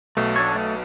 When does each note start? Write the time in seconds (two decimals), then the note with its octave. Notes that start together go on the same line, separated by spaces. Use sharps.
0.17 B1 B2 A3
0.36 D4 A4 C#5
0.55 A3